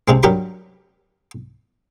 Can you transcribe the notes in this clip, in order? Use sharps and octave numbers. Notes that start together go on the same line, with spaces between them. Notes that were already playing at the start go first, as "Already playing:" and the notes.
C#2 C3 G#3 C4
G2 F#3 G4 A#4 F#5 B5